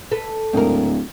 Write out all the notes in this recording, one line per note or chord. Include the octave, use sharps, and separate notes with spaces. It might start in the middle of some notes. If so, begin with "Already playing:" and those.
A4 B4
D1 G#2 A#4